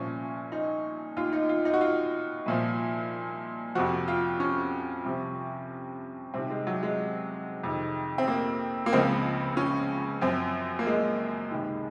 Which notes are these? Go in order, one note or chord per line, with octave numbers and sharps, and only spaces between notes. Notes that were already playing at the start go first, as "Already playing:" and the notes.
Already playing: C2 A#2 F3 C#4
D#4
D#2 D#3 F4
D#4
F4
D#4
F#4
F4
C2 A#2 F3
F2 C3 F3 F#4
F4
C#4
C2 C3 F3
C2 C3 D#3 C4
G#3
F#3
G#3
F2 C3 D#3
C4
A#3
A#3
C#2 C#3 F3 C4
C#4
F#2 F3 C4
A#3
G#3
C#2 C3 D#3